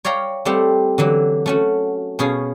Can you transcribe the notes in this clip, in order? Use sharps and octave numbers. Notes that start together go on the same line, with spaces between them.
C#5 D5 F5 G5 A#5
G3 A3 C4 G4 F#5
D3 E3 F#3
A3 C#4 F#4
B2 C#4 G#4 F5